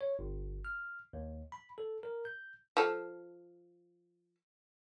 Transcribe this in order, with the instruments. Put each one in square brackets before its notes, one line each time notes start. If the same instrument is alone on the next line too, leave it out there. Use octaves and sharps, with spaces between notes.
[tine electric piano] C#5
G1
F6
D#2
B5
A4
A#4
G6
[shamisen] F3 A4